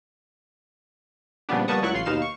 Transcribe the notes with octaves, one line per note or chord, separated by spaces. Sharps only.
A#2 C#3 F3 G3 B3 D4
G3 A#3 B3 A5 C#6 D#6
C#2 F#3 E4 C#6 F#6
A1 F4 C6 C7
D#2 B2 D#4 F5 E7
C#6